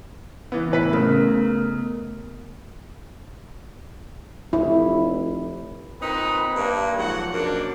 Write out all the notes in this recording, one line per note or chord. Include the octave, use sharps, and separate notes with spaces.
E3 B3
A2 B4 B6
C#3 A3 B3 A#4
F1 E4
A#2 C4 D#4 B4
G2 A#3
G#2 F3 F#3 F#4 F#5
F#2 B2 A#3 D4